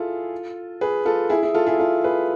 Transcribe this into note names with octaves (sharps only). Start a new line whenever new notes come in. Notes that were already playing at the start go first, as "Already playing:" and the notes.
Already playing: E4 F4 G#4 A4
G#4 B4
F4 A4
E4 G#4
E4 G#4
F4 A4
E4 G#4
F4 A4
G#4 B4